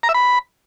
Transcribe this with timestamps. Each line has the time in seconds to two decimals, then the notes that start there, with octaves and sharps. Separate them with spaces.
0.03 A#5
0.09 E5
0.14 B5